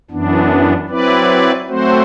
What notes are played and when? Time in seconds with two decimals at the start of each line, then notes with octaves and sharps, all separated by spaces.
0.10 F#2 E3 B3 D4
0.89 F#3 C4 E4 B4 D5
1.68 F#3 A3 C4 F#4 C5